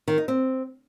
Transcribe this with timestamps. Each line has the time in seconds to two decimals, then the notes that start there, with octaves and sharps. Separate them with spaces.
0.08 D#3
0.18 D#4
0.28 C4